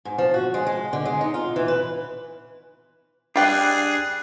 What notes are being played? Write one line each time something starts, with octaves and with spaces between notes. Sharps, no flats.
G#2
F3
F#4
G#3
G#3
D3
G#3
D#4
F4
E3
B4
G3 D4 G#4 G5 D6 F#6 A6 C7